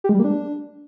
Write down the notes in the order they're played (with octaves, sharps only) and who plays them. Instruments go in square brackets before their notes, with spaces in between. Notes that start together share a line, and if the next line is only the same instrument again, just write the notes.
[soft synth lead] G4
G#3
G3
A#3
D4